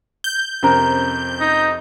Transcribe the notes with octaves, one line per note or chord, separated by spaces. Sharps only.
G6
F2 C3 C#4 A#4 C5 A#5
D#4